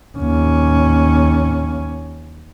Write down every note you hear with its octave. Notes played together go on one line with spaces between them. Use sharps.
D#2 C#4